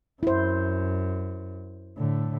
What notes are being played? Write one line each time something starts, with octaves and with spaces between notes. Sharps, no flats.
F#2 E4 C5
A2 D3